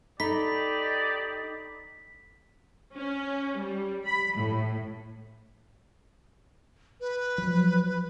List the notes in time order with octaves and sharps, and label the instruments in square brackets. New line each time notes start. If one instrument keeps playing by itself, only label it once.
[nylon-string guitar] D#4 [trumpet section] G4 D5 D#5 [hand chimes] A4 A#5 B5 [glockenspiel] B6
[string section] C#4
G3
B5
A2
[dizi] B4
[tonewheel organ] F3 F#3